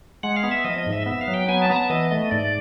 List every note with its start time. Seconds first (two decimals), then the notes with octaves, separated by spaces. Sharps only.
0.23 G#3 F#5
0.36 F5
0.43 B3
0.51 E5
0.65 F3 D#5
0.78 D#5
0.86 G#2
0.92 E5
1.06 B3 E5
1.21 F5
1.28 F#3
1.34 G5
1.48 B3 G#5
1.62 A5
1.70 B3 A#5
1.76 A5
1.90 E3 D#5
2.11 A3 D#5
2.31 G#2 D5